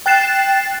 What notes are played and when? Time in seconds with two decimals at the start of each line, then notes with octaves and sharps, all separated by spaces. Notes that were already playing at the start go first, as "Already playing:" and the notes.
0.06 G5 F#6 A6 C7 E7